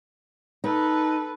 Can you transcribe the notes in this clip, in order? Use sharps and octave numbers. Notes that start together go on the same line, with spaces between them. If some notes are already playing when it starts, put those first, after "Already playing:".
D#4 A4 B4